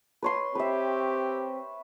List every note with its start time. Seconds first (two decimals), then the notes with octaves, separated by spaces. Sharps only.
0.23 B4 C#5 C6
0.55 C4 G4 B4 E5